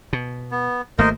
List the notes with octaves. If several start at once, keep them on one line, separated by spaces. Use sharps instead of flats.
B2
B3
G#1 A3 A#3 A#4 C5 D#5